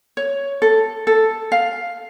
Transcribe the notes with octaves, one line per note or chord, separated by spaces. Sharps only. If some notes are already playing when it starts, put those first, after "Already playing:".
C#5
A4
A4
F5